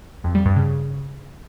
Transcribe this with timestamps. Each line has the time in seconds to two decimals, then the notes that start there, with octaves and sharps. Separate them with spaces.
0.24 F2
0.35 G3
0.46 G2
0.56 C#3